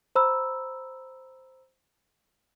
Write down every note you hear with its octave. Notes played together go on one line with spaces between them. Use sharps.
C5 A#5 B5 E6